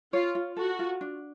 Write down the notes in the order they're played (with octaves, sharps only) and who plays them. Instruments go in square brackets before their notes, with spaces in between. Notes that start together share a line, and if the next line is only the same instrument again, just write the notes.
[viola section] F4 [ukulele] C#5
[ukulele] F4
[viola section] F#4 [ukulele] A4
[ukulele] F4
D4